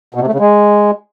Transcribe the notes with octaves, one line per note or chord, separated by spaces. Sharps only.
B2
C3
A3
C#3
G#3